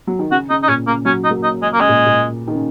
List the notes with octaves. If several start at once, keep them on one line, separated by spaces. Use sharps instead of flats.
F#3
D#3
C#3 F#4
C#3 D#4
D#4
A#2 C#4
C#3 A#3
C#3 F#3 C#4
D#4
F#3 A#3
D#4
G#3
A#3
C#3 G#3
A#2
A#2
D#3
C#3